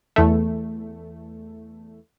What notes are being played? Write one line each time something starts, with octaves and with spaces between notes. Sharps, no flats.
E2 A3